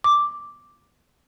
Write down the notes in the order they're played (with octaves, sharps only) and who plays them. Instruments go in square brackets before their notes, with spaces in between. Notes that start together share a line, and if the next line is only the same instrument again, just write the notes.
[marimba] D6